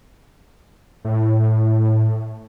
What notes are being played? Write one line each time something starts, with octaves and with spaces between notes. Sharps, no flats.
A2